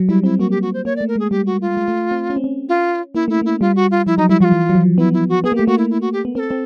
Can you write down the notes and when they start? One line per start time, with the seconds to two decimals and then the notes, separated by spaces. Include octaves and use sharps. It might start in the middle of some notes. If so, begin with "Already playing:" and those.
Already playing: F#3
0.09 G3 E4
0.24 C4 E4
0.39 A#3 F#4
0.51 G4
0.62 F#4
0.74 C5
0.85 A#3 C#5
0.96 D5
1.01 A3
1.08 A#4
1.16 G#3 G#4
1.31 G3 G4
1.46 F#4
1.61 F4
1.77 G#3
1.88 A3
2.11 C4
2.30 C#4
2.36 C4
2.44 C#4
2.69 F4
3.15 A#3 E4
3.28 A3 E4
3.42 A#3 E4
3.61 G3 F4
3.76 F#4
3.91 F4
4.06 F3 E4
4.18 F#3 D#4
4.29 G3 E4
4.40 F3 F#4
4.44 F4
4.52 E3
4.69 F#3
4.75 F3
4.98 B3 E4
5.13 E4
5.29 F#4
5.44 B3 G#4
5.52 A#3
5.56 G4
5.59 A3
5.67 A#3 F#4
5.78 E4
5.90 E4
6.01 F#4
6.13 G4
6.25 B3
6.35 C4 A#4
6.39 A4
6.51 C4